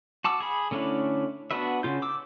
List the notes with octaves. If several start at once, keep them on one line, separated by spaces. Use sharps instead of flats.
F#4 A5 D6 E6
G#4 B5
D3 A3 C#4 D4 E4
B3 D4 F#4 B4 E5
C#3 F4 G6
D6 E6